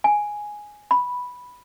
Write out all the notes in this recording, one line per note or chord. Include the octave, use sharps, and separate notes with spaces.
G#5
B5